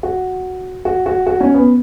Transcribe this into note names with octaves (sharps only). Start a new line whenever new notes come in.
F#4
F#4
F#4
F#4
C#4
B3